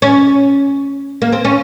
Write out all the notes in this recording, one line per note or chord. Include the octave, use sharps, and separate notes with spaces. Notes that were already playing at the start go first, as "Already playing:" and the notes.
C#4
A#3
C4
C#4